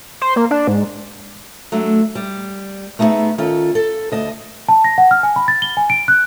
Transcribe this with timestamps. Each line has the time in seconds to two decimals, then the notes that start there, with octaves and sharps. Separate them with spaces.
0.21 C5
0.36 A#3
0.51 D4
0.67 G#2
1.72 F#3 A3 D4
2.15 G3
2.99 A3 B3 D#4 E4 G#4 E5
3.38 D#3 C#4 F4 A4
3.75 A4
4.12 D2 D#5 A5
4.69 A5
4.84 A#6
4.98 F#5
5.11 F6
5.23 G#5
5.36 B5
5.48 A6
5.62 G7
5.77 G#5
5.90 D7
6.08 F#6